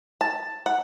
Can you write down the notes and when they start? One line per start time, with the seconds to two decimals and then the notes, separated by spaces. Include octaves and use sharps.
0.21 A5
0.66 F#5